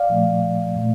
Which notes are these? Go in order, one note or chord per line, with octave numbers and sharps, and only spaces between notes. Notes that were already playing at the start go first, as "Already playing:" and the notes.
Already playing: D5 F5
A#2 F3 A3
A#2 A3